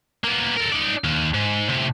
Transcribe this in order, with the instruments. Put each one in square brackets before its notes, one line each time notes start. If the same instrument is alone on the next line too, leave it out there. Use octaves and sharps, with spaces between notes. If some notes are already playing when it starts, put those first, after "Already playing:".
[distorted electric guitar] A#3 B3
A4 A#4
D#4 D5
D#2
G#2
A2 C3